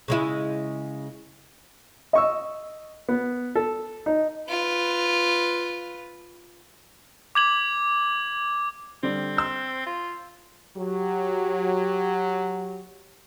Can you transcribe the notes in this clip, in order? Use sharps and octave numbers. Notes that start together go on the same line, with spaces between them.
C#3 G#3 E4
D#5 C#6 E6
B3
A4
D#4
F4 B4
D6 G#6 F#7
D3 G3 C4
C6 E6 G6
F4
F#3 G4